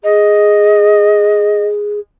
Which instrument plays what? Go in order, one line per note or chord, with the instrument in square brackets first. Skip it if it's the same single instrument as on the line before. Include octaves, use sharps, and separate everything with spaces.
[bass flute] G#4 [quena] D#5